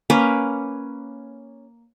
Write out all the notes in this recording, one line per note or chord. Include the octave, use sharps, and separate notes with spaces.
A#3 C#4 B4